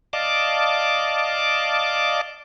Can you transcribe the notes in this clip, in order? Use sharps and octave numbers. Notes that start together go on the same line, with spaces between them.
D5 D#5 F5 A5 D6